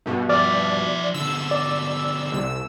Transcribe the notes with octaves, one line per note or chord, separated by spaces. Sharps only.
G2 B2
F3 D5 E5 F6
B2 D3 E6
D5
C2 E6